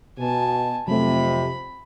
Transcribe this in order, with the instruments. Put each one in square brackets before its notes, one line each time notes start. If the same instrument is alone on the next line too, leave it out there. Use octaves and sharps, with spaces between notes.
[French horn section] B2 [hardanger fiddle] G#5 A5
[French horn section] F2 C3 [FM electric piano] F#3 A3 [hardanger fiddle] B5